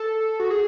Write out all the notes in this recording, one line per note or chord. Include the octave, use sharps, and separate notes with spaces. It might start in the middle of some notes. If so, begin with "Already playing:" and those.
Already playing: A4
F#4
G#4